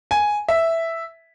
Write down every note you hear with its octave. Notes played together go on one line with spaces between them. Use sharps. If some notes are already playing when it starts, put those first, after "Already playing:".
G#5
E5